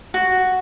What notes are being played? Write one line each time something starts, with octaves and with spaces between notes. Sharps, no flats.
F#4